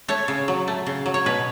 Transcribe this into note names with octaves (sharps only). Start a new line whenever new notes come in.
A3 C#5
C#3
F#3
A3
C#3
F#3
C#5
B2 B4